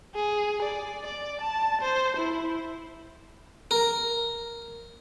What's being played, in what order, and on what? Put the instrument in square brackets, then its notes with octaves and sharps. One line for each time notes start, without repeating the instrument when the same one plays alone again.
[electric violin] G#4
D5
D5
A5
C5
E4
[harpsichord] A#4